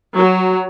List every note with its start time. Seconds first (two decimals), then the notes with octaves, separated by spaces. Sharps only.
0.16 F#3